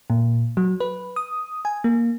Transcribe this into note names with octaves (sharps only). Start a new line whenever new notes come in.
A#2
F#3
B4
D#6
G#5
A#3